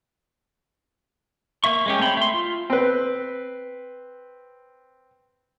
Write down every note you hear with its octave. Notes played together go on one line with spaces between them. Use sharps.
A#3 E5 C#6
G#3 C#4 G4
A3 C4 C#5 G5 B5
E5 C6
F4
C4 B4